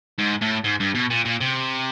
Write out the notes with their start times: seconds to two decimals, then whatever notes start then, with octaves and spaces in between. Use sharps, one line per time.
0.19 G#2
0.42 A2
0.64 G#2
0.80 G2
0.95 B2
1.10 A#2
1.25 A#2
1.40 C3